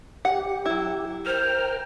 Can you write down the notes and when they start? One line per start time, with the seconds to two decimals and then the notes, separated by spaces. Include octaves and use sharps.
0.25 G4 F#5
0.66 F#3 E4
1.26 A#4 C5 G5 F6